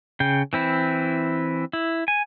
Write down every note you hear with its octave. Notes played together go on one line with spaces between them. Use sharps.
C#3 G5
E3 C4 E4
E4
G#5